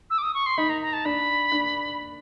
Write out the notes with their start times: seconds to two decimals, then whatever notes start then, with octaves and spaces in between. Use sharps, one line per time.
0.10 E6
0.18 D6
0.22 D#6
0.34 C#6
0.46 C6
0.58 D#4 B5
0.69 A#5
0.82 A#5
0.93 A5
1.05 D4 B5
1.52 D4